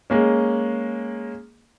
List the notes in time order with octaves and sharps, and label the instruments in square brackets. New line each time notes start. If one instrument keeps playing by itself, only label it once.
[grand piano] G#3 A#3 C#4